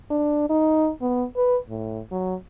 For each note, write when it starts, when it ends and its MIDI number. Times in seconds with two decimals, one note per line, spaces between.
0.10 0.49 62
0.50 0.90 63
1.01 1.25 59
1.36 1.57 71
1.69 2.00 45
2.11 2.35 54